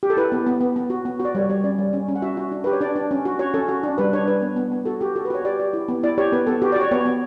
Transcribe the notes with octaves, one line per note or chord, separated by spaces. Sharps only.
G4
A4
E4 B4
B3
B3
B3
B3
F#4
B3
F#4
D5
G3 C#5
G3 C#5
C#4 D5
G3
C#4
C#4
F#5
F#4 E5
F#4
D4
G4 B4
C#5
D4 D5
D4
C#4
F#4
F#4 C#5
C#4 A4
F#4
D4
G3 B4
D4 C#5
D4 B4
B3
B3
B3
F#4 A4
F#4 G4
F#4 A4
B4
F#4 C#5
G4 D5
G4
E4
B3
E4 D5
G4 C#5
B3 B4
B3 A4
F#4 G4
D5
F#4 C#5
B3 C#5
B3